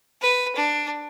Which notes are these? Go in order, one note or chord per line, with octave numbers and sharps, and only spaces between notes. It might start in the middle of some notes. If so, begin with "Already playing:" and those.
B4
D4